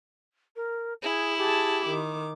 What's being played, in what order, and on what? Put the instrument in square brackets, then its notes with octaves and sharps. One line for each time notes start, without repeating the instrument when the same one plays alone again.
[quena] A#4
[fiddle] E4 [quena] G#4
[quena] G4 [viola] G#4 A5
[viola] D#3 D6